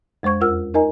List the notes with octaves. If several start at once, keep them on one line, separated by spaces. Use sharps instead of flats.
F2 G#3 C5 C#6 G#6
E2 F4 A#4 F#5 E6 F6
D#4 A#4 D#5 G#5 A#5